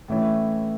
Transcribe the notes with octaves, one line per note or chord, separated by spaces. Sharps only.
A2 E3 A3 C#4 E4